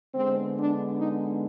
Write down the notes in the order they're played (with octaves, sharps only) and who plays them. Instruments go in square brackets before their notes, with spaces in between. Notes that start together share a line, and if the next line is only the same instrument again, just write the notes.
[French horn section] D3 G#3 B3 C4
D4
D#4